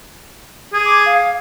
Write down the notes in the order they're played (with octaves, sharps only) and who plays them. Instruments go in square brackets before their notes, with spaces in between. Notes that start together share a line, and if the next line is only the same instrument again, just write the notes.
[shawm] G#4
[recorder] D6
F5